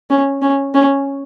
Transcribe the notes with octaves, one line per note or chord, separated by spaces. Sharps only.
C#4
C#4
C#4